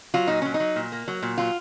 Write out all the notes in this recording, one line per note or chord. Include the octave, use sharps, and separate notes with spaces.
F#3 F4
A#2 D#4
F#3 C#4
D#4
F#3
A#2
A#3
F#3
A#2
F#3 F4